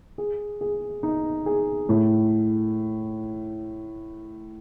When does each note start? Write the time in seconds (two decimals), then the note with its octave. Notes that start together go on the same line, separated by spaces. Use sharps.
0.18 G#4
0.61 G#4
1.03 D#4
1.46 G#4
1.89 A2